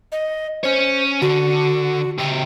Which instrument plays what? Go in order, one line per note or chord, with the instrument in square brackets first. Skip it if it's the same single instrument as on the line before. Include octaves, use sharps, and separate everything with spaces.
[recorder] D#5
[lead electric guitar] C#4 C#5 [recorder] C5
[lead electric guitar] D3 [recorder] F#4
[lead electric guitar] C#3 G4 [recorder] G5